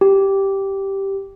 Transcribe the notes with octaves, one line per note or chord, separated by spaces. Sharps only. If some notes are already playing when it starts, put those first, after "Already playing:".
G4